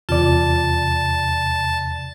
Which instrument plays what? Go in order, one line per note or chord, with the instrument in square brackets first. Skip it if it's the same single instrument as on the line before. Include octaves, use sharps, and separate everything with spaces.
[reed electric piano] E2 C3 D5 [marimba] F4 [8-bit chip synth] A5